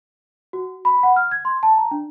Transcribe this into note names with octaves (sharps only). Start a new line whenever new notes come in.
F#4
B5
F#5
F6
G#6
C6
A5
A#5
D4